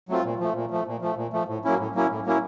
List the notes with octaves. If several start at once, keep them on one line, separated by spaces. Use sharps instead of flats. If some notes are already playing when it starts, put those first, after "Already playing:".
F#3 A3 C4 F4
A#2
F3 A3
A#2
F3 A3
A#2
F3 A3
A#2
F3 A3
A2
F#3 A#3 C#4 E4
A2
F#3 A#3 C#4 E4
A2
F#3 A#3 C#4 E4